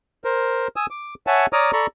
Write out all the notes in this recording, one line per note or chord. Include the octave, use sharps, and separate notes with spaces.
A#4 C5
G#5 D#6 E6
D6
C#5 E5 F#5 G#5 A5
C#5 D5 A#5 D6 D#6 F6
A4 D5 A#5 B5 C#6